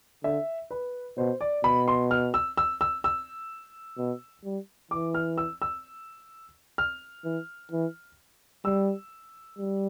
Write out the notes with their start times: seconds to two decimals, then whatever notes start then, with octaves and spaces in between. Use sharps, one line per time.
0.24 D3 E5
0.71 B4
1.17 B2 C5
1.41 D5
1.64 B2 B5
1.88 C6
2.11 F6
2.34 E6
2.57 E6
2.81 E6
3.04 E6
3.98 B2
4.44 G3
4.91 E3 D6
5.14 F6
5.38 E6
5.62 E6
6.78 F6
7.25 E3
7.72 E3
8.65 G3 E6
9.59 G3